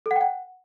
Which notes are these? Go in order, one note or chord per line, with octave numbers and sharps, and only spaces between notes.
A4
F#5
G5
F#5